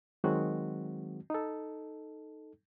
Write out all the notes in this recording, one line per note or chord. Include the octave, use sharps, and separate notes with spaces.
D#3 F#3 G#3 C4 F#4
D#4 A4